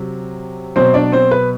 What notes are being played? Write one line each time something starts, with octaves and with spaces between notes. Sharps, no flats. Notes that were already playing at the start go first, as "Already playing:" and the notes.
Already playing: C3 F#3
B2 F#3 C4 C5
D4 D5
C4 C5
B4